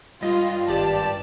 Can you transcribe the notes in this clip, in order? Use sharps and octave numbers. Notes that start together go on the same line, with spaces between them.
G2 F4 D#5
G#1 G4 D5 A5